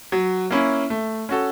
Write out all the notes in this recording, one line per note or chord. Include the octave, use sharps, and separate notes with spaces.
F#3
A#3 C#4 E4
A3
C#4 F#4 A4